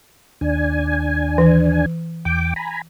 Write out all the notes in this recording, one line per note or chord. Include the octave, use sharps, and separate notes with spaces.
D#2 D4 G#5
E3
E2 G5 D6
G#5 A#5 B5